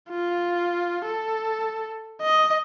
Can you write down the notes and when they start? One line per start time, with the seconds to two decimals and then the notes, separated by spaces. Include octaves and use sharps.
0.10 F4
1.05 A4
2.22 D#5